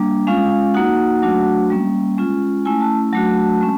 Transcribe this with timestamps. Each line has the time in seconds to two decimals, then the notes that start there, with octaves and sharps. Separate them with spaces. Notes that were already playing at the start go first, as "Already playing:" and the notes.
Already playing: G3 A#3 D4
0.27 G#3 C#4 F4 F5
0.74 A#3 D#4 F#4 F#5
1.22 F#3 A3 D4 F#4
1.70 G3 A#3 C#4
2.17 G#3 C#4 F4
2.65 A3 C#4 E4 G#5
2.81 A5
3.13 F#3 A3 D4 F#4 A5
3.61 G#3 C#4